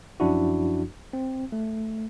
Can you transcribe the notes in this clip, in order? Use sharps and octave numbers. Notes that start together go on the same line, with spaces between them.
F#2 F3 D4 E4 F#4
C4
A3